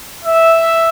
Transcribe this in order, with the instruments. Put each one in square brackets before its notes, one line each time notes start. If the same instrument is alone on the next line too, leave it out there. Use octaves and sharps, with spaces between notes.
[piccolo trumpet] E5